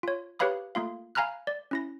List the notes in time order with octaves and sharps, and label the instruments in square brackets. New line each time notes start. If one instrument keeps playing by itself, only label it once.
[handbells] F4 C#5
G4 B4 C#5 F5 B5 D#6
A3 A#3 F4 F5
F5 G#5 A#5 B5 F6 F#6
D5
C#4 E4 A#6